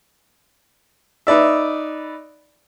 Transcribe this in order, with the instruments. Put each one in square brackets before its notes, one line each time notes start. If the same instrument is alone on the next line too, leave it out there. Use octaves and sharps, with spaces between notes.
[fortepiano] D#4 B4 D5 E5